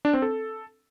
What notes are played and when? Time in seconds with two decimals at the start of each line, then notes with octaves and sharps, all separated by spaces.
0.05 D4
0.13 C4
0.22 A4